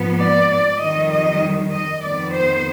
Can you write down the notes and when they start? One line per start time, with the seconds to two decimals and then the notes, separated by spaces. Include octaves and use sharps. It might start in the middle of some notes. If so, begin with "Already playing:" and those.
Already playing: G#2 F3 B3
0.22 D5
0.52 D5
0.82 F2 D#3 G3 D#5
1.13 D#5
1.73 D#5
2.03 F2 D#3 B3 D5
2.33 C5